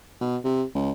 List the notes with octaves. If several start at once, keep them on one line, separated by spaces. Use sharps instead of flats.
B2
C3
C#2